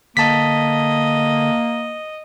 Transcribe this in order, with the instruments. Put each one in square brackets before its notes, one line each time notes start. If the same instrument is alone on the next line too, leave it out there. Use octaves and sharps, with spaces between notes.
[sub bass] D3 [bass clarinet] A#3 [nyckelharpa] D#5 [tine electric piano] A5 B6